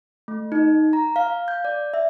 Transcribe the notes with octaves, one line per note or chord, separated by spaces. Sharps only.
A3
D#4
A#5
F5
G6
D5
E5